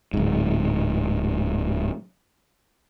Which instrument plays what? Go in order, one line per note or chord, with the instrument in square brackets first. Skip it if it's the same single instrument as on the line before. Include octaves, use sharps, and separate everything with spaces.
[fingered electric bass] D1 G#2